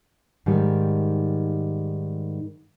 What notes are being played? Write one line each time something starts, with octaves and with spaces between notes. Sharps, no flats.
G#2 D#3 G3